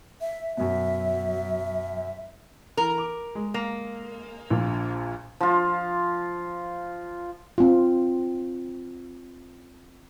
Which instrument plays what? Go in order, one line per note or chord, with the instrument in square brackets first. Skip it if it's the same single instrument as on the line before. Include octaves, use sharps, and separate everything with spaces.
[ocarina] E5
[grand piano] F#2 B2 [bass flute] F#3 [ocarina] E5
[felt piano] E3 [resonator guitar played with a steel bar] A#4
[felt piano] D6
G#3
[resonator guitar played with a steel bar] A#3
[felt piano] A#1 A#2
[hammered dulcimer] F3 F4
[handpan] C4 F4